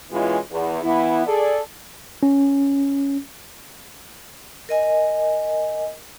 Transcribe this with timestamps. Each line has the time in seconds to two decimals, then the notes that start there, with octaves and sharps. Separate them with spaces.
0.12 B2 E3 G#3 C#4 E4 F4
0.51 E2
0.83 E3 B3 E4
1.27 G#4 A4 D5
2.23 C#4
4.69 A#4 D#5 G#5